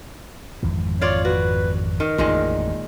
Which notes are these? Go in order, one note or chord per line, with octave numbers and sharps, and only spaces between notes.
G#1 F2 E3
F4 C#5 D5 F5
F#4 B4
D#3 A#4
A1 F2 A#2 D#3 G#3